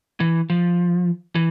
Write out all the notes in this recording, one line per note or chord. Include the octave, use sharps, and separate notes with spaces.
E3
F3
E3